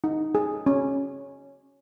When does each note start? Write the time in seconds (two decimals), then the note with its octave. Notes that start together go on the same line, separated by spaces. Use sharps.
0.04 D#4
0.35 G#4
0.66 C#4